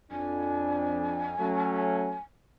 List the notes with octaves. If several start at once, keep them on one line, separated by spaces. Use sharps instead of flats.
F2 D4 G#5
F#3 A3 C#4